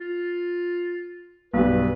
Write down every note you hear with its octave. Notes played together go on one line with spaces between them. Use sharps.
F4
B1 G2 B4